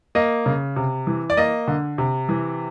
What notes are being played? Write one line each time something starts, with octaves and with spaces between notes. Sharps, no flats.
A#3 D#5
C#3
C3
E3
D5
A#3 D#5
D3
C3
E3